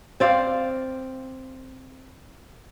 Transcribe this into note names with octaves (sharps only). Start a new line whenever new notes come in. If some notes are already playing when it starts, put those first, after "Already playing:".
C4 D5 F5